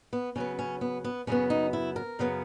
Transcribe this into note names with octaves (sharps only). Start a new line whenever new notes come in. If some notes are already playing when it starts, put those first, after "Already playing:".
B3
C#3 F#3 B3 C#4
C#4
B3
B3
F#2 C#3 F#3 B3 C#4
D#4
E4
A#4
F#2 C#3 F#3 B3